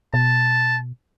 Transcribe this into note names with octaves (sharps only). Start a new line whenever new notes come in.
B2 A5